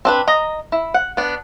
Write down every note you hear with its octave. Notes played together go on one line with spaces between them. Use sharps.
C4 D4 B4
D#5 A#5
E4
F#5
B3 D4